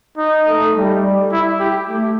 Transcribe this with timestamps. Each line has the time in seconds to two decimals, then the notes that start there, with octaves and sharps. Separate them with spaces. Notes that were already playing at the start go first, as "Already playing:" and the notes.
0.18 D#4
0.47 A3
0.75 G3
1.32 E4
1.60 G4
1.89 A3